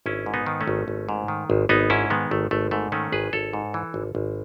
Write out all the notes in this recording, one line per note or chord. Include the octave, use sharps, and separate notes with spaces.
G#1 C#4 E4
G#2
B3 D#4
D#3
A3 C#4
G#1
G#1
G#2
D#3
G#1
G#1 B3 D#4
G#2 C#4 E4
D#3 G#3 B3
G#1 A3
G#1 A3
G#2 A3
D#3 A3 C#4
G#1 G#4 B4
G#1 A4 C#5
G#2
E3
G#1
G#1